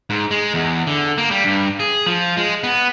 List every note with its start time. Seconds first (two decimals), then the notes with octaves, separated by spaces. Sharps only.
0.10 G#2
0.31 G#3
0.54 E2
0.87 D3
1.18 A#3
1.31 G3
1.44 G2
1.80 G#4
2.06 F3
2.37 G#3
2.63 B3